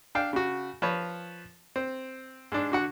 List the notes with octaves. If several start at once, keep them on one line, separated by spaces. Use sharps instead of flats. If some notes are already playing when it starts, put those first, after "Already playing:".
D4 F5 G5
C#3 F#4
F3 B4 C#5
C4
G#2 D4
D3 F#4 F#5